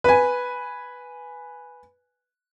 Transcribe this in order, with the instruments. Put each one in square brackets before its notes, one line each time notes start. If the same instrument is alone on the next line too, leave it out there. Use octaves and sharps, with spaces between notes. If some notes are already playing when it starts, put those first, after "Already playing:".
[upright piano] B4 G#5